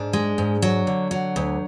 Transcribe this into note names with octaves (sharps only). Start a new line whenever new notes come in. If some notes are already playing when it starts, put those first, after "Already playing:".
Already playing: G#2 D4
G#3
G#2
F#3
D3
F#3
D2